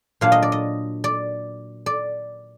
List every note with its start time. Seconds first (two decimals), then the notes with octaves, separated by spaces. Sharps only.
0.21 A#2 F#3 D4 F5
0.32 D#5
0.42 D5
0.52 D#5
1.04 D5
1.86 D5